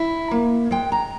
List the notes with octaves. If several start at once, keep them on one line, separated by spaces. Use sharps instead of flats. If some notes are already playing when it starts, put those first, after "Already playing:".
Already playing: E4 E5
A#3
G#3 G5
A#5